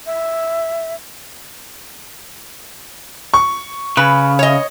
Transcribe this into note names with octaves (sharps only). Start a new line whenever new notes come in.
E5
C#6
C#3 B4
C#5 D#5